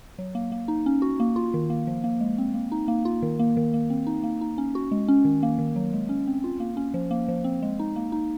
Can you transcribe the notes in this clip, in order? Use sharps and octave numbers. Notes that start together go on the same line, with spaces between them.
F#3
A#3
A#3
D#4
C#4
F#4
A#3
F4
D#3
A#3
F3
A#3
G#3
C4
A#3
D#4
A#3
F4
D#3
A#3
D#3
A#3
C4
D#4
A#3
D#4
C#4
F#4
G#3
C#4
D#3
A#3
D#3
F#3
G#3
C#4
C4
F4
A#3
C#4
F3
A#3
F3
C4
G#3
D#4
A#3
D#4